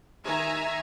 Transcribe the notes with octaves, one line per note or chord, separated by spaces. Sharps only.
D#3 E5 G#5 A#5